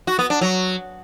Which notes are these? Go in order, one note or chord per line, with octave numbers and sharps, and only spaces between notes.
F#4
B3
D4
F#3